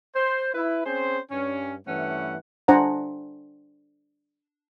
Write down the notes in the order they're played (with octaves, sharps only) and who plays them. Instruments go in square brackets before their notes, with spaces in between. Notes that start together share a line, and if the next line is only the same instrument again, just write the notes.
[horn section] C5
E4 B4
C4 C#4 G#4 C5
G2 C#4
G2 E3 A3 C#4 F#5
[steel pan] D4 C5 F#5 G#5 A#5